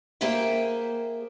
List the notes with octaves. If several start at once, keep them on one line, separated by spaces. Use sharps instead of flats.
A#3 G#4 C5 E5 G5